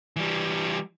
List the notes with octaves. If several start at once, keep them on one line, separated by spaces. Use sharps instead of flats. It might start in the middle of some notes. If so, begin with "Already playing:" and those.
E3 G3